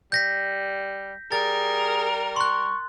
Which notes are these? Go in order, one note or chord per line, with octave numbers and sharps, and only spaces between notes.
G3 G6 A#6 B6
G3 G#4 A#4 A6
C6 C#6 F#6